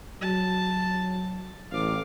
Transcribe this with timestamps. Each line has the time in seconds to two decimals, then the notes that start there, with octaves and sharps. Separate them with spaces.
0.22 F#3 A5
1.72 A1 F5 D6